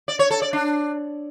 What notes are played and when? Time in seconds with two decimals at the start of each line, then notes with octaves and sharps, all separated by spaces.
0.08 D5
0.19 C#5
0.31 A4
0.42 D5
0.53 D4